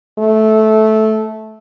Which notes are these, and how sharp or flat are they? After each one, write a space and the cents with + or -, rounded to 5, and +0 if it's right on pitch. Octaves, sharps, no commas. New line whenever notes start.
A3 -15